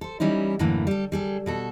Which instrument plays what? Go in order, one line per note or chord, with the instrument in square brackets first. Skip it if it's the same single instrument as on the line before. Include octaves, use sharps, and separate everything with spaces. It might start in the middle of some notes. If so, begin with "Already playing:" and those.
[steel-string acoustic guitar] A4 C5
E3 G3 C#4 D#4 E4
F#2 A2 D3 E3 A3 A#3
G3 A4
G3 G#4 A4
B2 F#4 A4